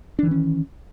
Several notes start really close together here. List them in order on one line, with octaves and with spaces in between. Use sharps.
D4 E3 D#3 C#4